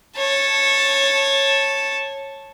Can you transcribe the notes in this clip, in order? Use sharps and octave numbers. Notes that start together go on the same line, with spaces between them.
C#5 A5